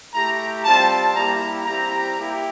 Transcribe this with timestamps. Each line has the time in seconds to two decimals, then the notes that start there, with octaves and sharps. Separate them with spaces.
0.13 A3 E4 G4 A#5
0.64 G3 C4 F4 A5
1.15 G3 A#3 E4 G4 A#5
1.66 G3 C4 E4 G4 A#5
2.17 A#3 E4 G4